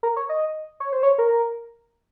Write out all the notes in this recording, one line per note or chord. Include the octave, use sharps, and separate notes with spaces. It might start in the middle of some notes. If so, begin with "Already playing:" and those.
A#4
C#5
D#5
C#5
C5
C#5
A#4